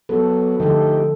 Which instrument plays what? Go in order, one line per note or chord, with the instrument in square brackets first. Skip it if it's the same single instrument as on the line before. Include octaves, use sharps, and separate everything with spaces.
[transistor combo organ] F#3 B3 [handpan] A4
[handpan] D3 F3 A4 [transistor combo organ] A3 D#4 G4